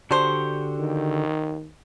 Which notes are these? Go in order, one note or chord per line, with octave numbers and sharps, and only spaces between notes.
D3 D4 F#4 G4 C5
D#3